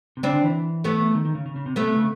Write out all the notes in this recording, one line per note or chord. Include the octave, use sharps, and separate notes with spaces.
C3
C#3 C4 D4
D3
E3
A3 B3
D#3
D#3
C#3
C#3
C#3
C3
B2 A3 B3
C3
C#3